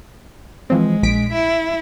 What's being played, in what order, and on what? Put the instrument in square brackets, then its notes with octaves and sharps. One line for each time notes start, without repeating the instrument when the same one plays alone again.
[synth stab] E3 F3 C4 [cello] G#3
[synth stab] A#1 B6 D7
[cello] E4